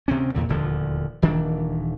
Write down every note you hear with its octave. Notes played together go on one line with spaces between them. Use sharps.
D2 C3 C4 C#4
E2 A#2 D3
D#1 D2 D3 F3
D#1 D#3 E3 D4